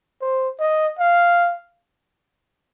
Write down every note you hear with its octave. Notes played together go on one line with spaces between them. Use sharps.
C5
D#5
F5